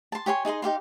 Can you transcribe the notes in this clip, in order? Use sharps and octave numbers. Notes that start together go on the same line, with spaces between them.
A5 C6
G4 C#5 G#5 C6
D#4 G#4 D#5 C6
D#4 G4 F5 C6